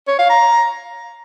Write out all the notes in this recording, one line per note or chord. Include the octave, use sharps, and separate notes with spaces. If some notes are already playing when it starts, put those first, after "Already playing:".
C#5
F5
A#5